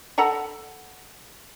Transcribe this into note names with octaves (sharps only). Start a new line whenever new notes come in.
A4 F#5 A#5 B5